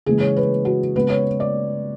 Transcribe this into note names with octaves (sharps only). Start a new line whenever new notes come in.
C#3 E3 G#3 G#4
C#5
B4
F#4
C#3 G#3 B3 B4
C#5
D5